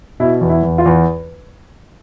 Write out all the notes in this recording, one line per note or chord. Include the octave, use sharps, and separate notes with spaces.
B2 E4
E2
E4
E2
F4
E2